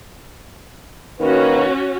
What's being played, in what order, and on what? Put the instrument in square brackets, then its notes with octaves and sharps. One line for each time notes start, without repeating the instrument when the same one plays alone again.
[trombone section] D#3 A#3 B4 [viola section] C#4 F#4